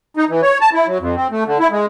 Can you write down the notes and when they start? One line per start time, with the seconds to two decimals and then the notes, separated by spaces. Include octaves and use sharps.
0.17 D#4
0.29 E3
0.42 C#5
0.61 A5
0.73 E4
0.87 F#3
1.00 F2
1.16 C4
1.31 A3
1.46 D3
1.60 E4
1.71 G#3